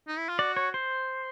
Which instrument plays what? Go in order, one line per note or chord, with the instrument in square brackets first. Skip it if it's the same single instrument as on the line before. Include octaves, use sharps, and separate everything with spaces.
[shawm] D#4
E4
F4
[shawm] F#4 [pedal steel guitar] D5
[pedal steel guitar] C#5
C5